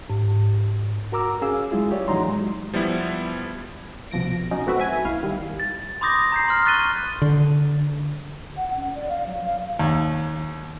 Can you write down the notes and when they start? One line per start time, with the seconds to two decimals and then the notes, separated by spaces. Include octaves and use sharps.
0.10 G#2
1.12 F#4 A#4 A#5 D6 E6
1.42 C#4 G#4 F5 E6
1.71 F#3 G#3 E4 F4 G#4
1.91 G4 C#5 D5
2.08 A2 E3 F#3 D#4 A#5 C6
2.28 G#3
2.73 F3 G3 B3 E4
4.11 C2 B2 F3 A#6 D7
4.51 F#3 C#4 D#4
4.66 A3 C4 F#4 B4 E5
4.80 E5 G#5
5.05 B1 E4 F5
5.23 D#3 G3
5.60 A6
6.01 B5 C6 D6 D#6 G6 A#6
6.32 A#5 G6 C7
6.48 C6 D#6 F6
6.65 C#6 F#6 A6 B6 D#7 G7
7.22 D3
8.57 F#5
8.76 C#4
8.94 D5
9.09 F5
9.26 F#3
9.44 F5
9.79 D#2